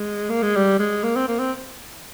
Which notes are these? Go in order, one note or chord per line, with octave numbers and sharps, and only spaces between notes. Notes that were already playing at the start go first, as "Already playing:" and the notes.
Already playing: G#3
A#3
G#3
G3
G#3
A#3
C4
A#3
C4